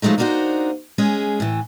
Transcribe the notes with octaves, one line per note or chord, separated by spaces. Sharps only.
F3 F#3 G#3 A3 D#4
A#3 D4 D#4 F4 F#4 C5
G#3 C#4 G#4
A2 E3